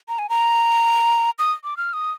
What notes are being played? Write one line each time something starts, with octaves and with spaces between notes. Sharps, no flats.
A#5
G#5
A#5
D#6
D6
F6
D#6